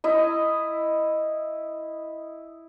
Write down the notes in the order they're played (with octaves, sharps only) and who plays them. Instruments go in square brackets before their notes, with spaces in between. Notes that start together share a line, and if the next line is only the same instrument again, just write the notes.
[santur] E4 D#5